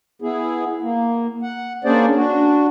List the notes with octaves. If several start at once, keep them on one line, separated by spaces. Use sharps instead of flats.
B3 E4 G#4
A#3
F#5
A#3 C#4 D4 G#4 C5 D5
D4 F#4